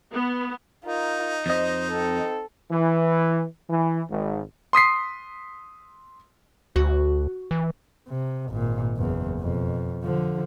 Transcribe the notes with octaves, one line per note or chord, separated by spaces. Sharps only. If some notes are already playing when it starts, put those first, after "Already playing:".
B3
D#4 F4 A#4
F2 C5 D#5
C4 A4
E3
E3
G#1
C6 D#6 B6 C7
D2 F#4
E3
C3
G#1 A#2
F#1 E2
F2 B2
D3 F3